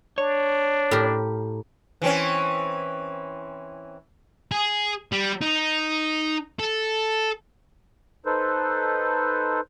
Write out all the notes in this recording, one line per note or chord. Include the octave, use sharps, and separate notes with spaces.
D4 C#5
A2 G4 A#4
E3 C4 C#4
G#4
G3
D#4
A4
D#4 A4 B4 C5